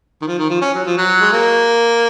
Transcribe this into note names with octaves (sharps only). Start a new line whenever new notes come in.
D#3
F3
D#3
F3
C#4
F#3
F3
F#3
G#3
A#3